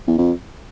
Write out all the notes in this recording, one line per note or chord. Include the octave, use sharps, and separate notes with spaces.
E2
F2